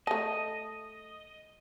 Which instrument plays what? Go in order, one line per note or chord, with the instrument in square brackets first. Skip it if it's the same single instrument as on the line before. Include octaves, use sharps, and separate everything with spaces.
[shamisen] A3 A5 [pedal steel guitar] D#5